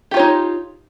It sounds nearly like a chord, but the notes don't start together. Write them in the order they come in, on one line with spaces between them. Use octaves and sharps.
G4 F4 C#5 D#4